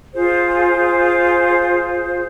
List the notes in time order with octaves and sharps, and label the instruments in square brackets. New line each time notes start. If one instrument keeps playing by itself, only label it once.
[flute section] F4 G#4 C5